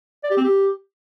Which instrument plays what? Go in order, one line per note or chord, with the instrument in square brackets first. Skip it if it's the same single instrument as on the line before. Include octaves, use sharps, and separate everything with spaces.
[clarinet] D5
G4
C4
G4